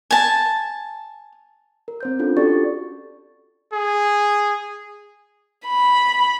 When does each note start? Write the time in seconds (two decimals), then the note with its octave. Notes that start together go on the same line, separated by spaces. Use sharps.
0.11 G#5 A5
1.88 A#4
2.01 C4 C5 G6
2.19 C#4 D4 F4 A4
2.37 F#4 G4 A4 D5 C#6 A6
3.73 G#4
5.67 B5